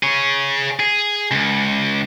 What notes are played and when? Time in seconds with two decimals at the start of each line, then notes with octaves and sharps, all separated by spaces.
0.03 G#4 C#5
0.79 G#4
1.31 C#2